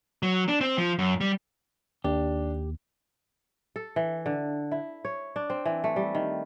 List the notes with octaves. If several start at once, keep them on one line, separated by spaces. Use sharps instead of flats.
F#3
D4
C4
F3
F#2
G3
D#2 D4 G4
A4
E3
D3
E4
C#5
D4
C4
E3
A3
G3
D#3